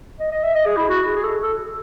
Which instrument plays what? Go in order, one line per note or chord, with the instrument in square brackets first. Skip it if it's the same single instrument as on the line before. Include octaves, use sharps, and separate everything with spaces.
[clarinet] D#5
D#5
E5
D#5
G#4
E4
F#4
G#4
G#4
A4
A4